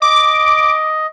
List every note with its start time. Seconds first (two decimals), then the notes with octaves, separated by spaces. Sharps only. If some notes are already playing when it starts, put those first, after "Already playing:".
0.02 D#5 D6